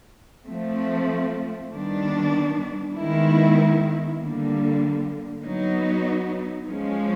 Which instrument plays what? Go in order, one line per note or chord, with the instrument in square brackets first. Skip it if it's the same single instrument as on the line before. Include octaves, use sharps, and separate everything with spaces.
[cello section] F3 A3 C4
D#3 G3 B3 D4
D#3 G#3 B3 E4
D3 G3 A#3
F#3 B3 D#4
F3 G#3 C#4